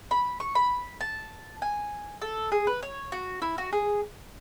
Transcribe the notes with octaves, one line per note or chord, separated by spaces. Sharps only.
B5
C#6
B5
A5
G#5
A4
G#4
B4
C#5
F#4
E4
F#4
G#4